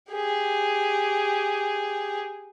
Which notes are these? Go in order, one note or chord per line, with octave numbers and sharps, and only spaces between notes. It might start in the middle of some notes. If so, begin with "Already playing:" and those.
G4 G#4